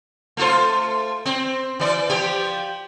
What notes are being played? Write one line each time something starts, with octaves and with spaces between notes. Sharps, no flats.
A3 F4 C5
C4
E3 D5
F3 G4